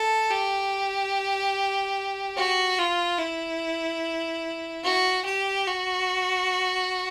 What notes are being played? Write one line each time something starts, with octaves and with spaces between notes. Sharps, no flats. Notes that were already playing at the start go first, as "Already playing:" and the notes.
Already playing: A4
G4
F#4
F4
E4
F#4
G4
F#4